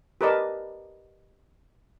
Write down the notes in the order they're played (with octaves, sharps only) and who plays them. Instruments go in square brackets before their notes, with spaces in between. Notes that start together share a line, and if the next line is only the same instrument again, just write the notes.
[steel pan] G4 A#4 B4 D5 D#5 A5